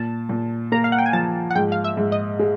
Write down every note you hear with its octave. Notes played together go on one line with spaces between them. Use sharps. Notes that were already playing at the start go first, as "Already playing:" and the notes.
Already playing: A#2 A5
A#2
A#3 A#5
F5
F#5
G5
G#5
F3 A5
F#5
G#2 G5
F5
E5
G#2
D#5
G#3